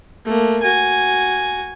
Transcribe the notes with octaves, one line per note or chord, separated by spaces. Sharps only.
A3 A#3
F#4 G#5